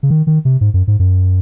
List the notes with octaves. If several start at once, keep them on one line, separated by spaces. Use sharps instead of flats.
C#3
D#3
D#3
C3
G#2
F#2
G#2
F#2